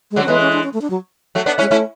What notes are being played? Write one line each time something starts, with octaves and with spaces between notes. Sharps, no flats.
G#3
D3 F#3
C#4
E3 G#3 B3
C#4
D4
C#4
A3
D4
F#3
F#3 A3
B3 D4
G#3 C#4 E4
A3 C#4 E4